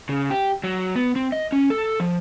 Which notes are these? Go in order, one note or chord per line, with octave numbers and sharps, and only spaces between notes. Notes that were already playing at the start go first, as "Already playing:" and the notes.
C#3
G4
F#3
B3
C4
D#5
C#4
A4
F3